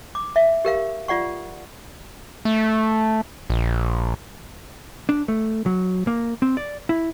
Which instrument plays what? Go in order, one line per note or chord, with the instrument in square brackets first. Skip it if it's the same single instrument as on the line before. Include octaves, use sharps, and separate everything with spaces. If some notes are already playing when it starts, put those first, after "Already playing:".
[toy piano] D6
E5
G4 A#4 F5
F4 D5 F#5 C#6
[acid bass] A3
A#1
[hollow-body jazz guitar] D4
A3
F#3
A#3
C4
D5
E4